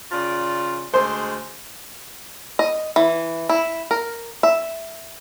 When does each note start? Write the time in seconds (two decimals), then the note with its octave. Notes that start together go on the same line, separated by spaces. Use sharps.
0.12 C#3 F4 D5
0.94 D2 G#3 C5
2.59 D#5
2.96 E3
3.50 E4
3.91 A#4
4.43 E5